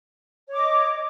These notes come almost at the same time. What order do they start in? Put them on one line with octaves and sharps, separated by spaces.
C#5 D6 D#5